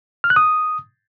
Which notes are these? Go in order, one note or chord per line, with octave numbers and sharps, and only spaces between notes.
F6
F#6
D#6